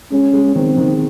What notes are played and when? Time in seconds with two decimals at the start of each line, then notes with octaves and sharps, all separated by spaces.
0.11 G#3 C#4
0.33 G#3
0.55 D#3 C4
0.78 D#3